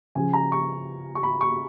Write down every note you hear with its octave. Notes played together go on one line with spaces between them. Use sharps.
C#3 F3 G#5
A#5
C#6
C#6
B5
C#6